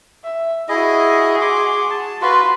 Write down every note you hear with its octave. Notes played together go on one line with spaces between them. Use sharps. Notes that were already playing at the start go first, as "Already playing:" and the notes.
E5
E4 F#4 G#4 D#5
C6 D6
A5
F4 F#4 B4 C6